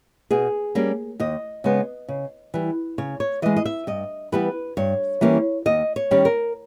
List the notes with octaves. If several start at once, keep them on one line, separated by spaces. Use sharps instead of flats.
B2 G#4
G3 A#3 C#4
D#2 D#5
C#3 G#3 B3
C#3
E3 G3
C#3 C#5
C#5
E3 G#3 D#5
D#5
E5
G2 D#5
E3 G3 B3 B4
G2 C#5
E3 G3 A#3 C#4
D#2 D#5
C#5
D#3 G3 C#4
A#4